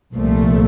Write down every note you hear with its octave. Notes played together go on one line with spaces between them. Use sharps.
C2 A#2 F3 A3